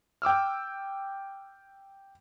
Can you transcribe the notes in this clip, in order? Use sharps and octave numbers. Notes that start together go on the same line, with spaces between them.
G5 D6 E6 F6